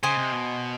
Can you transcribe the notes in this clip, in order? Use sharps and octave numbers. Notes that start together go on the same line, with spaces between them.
C#3 C5 D#5 G#5
C3
B2